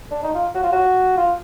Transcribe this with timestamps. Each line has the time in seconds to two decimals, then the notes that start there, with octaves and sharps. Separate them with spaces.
0.11 D4
0.23 D#4
0.34 F4
0.55 F#4
0.64 F4
0.72 F#4
1.17 F4